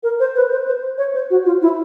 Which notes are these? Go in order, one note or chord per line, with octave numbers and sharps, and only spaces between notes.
A#4
C5
B4
C5
C5
C#5
C5
F#4
F4
E4